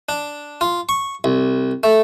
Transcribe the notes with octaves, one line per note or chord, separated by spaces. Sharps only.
D4
F4
C#6
C2
A3